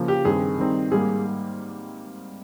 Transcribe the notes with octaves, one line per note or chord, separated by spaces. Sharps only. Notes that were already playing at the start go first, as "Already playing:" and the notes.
Already playing: C#3 F3 A#3
G4
G2 D#3 G3 C4 G#4
D#3 G3 C4 D#4
G#2 G3 A#3 G#4